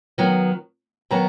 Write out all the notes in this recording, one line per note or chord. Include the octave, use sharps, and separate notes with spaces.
D#3 F#3 B3
D#3 F#3 B3 A#5